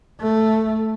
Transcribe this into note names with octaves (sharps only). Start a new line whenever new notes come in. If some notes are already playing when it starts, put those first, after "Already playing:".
A3